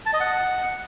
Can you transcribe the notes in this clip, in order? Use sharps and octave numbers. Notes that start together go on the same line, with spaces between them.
A5
D#5
F#5